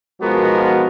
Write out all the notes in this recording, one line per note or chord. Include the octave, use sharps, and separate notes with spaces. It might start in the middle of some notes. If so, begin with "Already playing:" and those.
B1 F3 G#3 B3 F#4 A#4